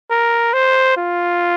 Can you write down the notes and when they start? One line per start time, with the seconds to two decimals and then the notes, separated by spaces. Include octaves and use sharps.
0.11 A#4
0.54 C5
0.97 F4